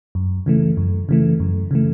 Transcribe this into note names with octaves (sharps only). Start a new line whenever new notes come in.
F#2
C#3 E3 A3
F#2
C#3 E3 A3
F#2
C#3 E3 A3